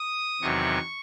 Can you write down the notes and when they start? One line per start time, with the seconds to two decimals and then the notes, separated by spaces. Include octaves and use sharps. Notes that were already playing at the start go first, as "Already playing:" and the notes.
Already playing: D#6
0.41 E2 C3 D#3 F#3 C#6